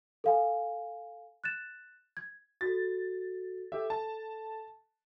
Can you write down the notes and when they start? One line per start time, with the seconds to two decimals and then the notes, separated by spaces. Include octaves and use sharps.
0.24 A4 F5 G#5
1.44 F#6 A6 E7
2.17 G#6
2.61 F#4 A4 A6
3.72 G4 A4 E5
3.90 A5